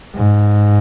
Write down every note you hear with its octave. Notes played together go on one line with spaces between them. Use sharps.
G#2